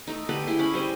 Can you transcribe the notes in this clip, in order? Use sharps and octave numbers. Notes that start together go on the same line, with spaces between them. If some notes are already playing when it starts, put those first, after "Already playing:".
A3 D#4
D3 G4 B4 B5
E4 G#4 C6
C#4 B5
G3 C5 D#5